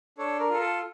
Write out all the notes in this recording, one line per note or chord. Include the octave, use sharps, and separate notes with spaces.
D4 A4 C#5
A#4
F4 A4
A4